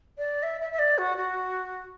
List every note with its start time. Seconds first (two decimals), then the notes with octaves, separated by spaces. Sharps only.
0.18 D5
0.43 E5
0.61 E5
0.72 E5
0.79 D5
0.98 F#4
1.17 F#4